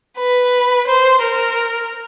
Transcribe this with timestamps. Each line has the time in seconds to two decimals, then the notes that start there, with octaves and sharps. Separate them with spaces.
0.18 B4
0.87 C5
1.22 A#4